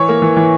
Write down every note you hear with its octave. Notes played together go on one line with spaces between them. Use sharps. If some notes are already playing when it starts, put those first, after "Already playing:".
Already playing: E3 C#5
A#3
E3
E3